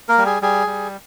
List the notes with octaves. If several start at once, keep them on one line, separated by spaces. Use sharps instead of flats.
A#3 A#4
G3
G#4
G3 G#4
G3